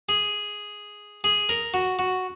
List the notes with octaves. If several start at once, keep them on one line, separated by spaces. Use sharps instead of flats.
G#4
G#4
A#4
F#4
F#4